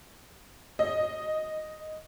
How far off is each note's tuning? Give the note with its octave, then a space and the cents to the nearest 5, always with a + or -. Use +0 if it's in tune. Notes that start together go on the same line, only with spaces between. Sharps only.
D#5 +0